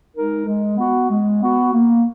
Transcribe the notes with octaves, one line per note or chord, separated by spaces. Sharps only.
G#3 D#4 A#4
G#3
B3 F#4
G#3
B3 F#4
A#3